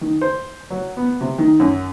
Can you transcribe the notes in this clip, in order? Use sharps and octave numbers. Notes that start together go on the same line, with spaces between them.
D#3
C5
F#3
B3
C3
D#3
F#2